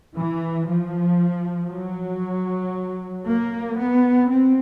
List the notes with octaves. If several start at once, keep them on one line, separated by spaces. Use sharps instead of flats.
E3
F3
F#3
A#3
B3
C4